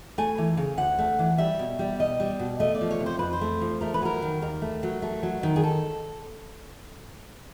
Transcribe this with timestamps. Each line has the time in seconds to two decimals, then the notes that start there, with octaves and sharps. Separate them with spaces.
0.18 A3 G#5
0.38 E3
0.57 C#3
0.77 D2 F#5
0.98 A3
1.19 E3
1.38 G3 E5
1.59 B2
1.79 G3
1.99 B2 D#5
2.20 G3
2.39 B2
2.60 A3 D#5
2.75 D5
2.81 F3
2.91 C#5
3.00 C3
3.06 C5
3.19 F2 B4
3.33 C5
3.41 A3
3.61 F3
3.81 A3 A#4
3.94 B4
4.02 F#3 A#4
4.22 D#3
4.42 D#2 A#4
4.62 A3
4.83 F#3
5.02 A3
5.23 F#3
5.43 D#3
5.56 G#4
5.63 A4